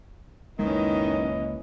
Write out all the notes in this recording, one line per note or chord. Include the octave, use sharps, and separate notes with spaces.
C#2 F#2 D#3 E3 G#3 A#3 C#4 D#5